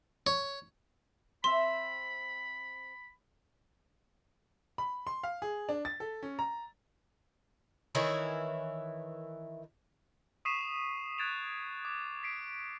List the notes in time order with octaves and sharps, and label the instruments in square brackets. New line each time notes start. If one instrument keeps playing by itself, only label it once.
[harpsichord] C#5
[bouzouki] C4 E5 [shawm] B5 [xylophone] C6
[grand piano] B5
C6
F5
G#4
D4
A6
A4
C#4
A#5
[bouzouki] D#3 E3 E4 C#5
[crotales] C#6 D#6 B6 C7 D#7 E7
F#6 G#6 A6 D7 E7 F7
D6
B6 C7 D7